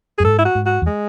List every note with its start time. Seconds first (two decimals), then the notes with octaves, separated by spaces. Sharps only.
0.18 F#2 G#4
0.24 G#2 A4
0.38 E4
0.45 F#4
0.55 G#2
0.66 F#4
0.82 E2
0.87 G#3